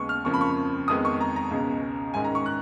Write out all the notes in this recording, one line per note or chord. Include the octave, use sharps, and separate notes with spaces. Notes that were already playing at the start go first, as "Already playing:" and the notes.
Already playing: D#2 C#3 G#3 B3 C#6
F6
F2 C#3 F3 A#3 C#6
B5
C#6
F2 D#3 G#3 B3 D#6
C#6
A#5
A#5
C#2 B2 G#3 C#4
G#2 D#3 G#3 C#4 G#5
A#5
C#6
F#6